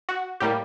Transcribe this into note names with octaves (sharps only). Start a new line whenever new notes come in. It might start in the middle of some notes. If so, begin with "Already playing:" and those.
F#4
A2 G3 A#3 G4